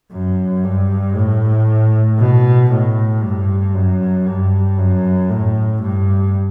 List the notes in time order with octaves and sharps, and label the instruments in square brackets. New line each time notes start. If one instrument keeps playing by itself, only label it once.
[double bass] F#2
G2
A2
B2
A2
G2
F#2
G2
F#2
A2
G2